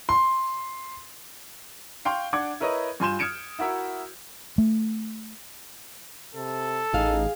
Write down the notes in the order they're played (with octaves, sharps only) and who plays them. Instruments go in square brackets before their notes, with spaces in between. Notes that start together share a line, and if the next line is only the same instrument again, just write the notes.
[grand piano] C6
[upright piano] F5 G5 C6 C#6 G6
D4 F#5 D6 G#6
E4 A#4 B4 C#5 D#5
G2 F4 G#5 C6 G6 E7
D#6 F6 G#6 C#7 D7 E7
E4 F#4 A#4 E5
[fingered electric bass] A3
[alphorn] C3 [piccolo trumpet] A4
[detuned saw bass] A1 [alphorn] D#4 [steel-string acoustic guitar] G#4 F5